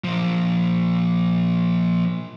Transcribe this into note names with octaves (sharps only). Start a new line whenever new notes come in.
A#2 F3